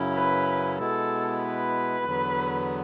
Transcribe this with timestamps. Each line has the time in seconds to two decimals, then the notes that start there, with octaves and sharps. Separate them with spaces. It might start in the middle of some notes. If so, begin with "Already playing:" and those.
Already playing: F#2 C#3 F#3 C#4 E4
0.15 B4
0.78 B2 G#3 B3 E4 A4
1.42 B4
2.05 E2 D3 F#3 B3